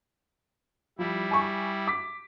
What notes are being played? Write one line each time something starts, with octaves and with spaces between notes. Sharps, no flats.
F3 G3 E4
G#5 C#6
D6 B6